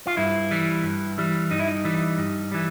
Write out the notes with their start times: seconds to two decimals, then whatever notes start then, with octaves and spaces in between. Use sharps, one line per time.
0.07 F4
0.17 G2 E4
0.51 E3 G3
0.83 G2
1.18 E3 G3
1.51 G2 D#4
1.59 E4
1.67 D#4
1.85 E3 G3
2.18 G2
2.52 E3 G3